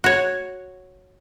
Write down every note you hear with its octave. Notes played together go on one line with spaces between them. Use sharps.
F#4 C#5